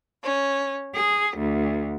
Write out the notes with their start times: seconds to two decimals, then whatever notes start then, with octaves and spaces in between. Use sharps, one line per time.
0.22 C#4
0.95 G#4
1.37 D2